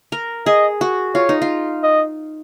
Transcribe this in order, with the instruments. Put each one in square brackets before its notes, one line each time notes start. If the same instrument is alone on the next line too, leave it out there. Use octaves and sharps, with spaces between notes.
[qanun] A#4
[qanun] G#4 [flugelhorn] D#5
[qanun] F#4
[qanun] F4 [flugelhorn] C#5
[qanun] D#4
F4
[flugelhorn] D#5